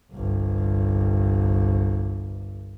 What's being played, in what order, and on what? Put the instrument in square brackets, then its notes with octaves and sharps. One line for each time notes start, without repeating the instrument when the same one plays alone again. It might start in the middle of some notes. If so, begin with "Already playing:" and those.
[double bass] G1 C2